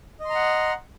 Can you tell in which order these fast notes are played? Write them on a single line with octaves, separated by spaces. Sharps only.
D#5 C6 A#5 F#5